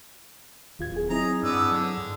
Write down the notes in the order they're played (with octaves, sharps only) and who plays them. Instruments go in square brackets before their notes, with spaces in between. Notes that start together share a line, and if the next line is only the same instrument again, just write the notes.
[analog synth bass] D1 [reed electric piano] D#2 F4 G#6
[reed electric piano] G#4
[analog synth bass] F#3 [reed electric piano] C4 E4 [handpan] D#4 G#4 [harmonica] A#5
[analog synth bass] G2 [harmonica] B3 D5 E5 [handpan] D4
[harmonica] D3 [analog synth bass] F#3
[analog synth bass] G2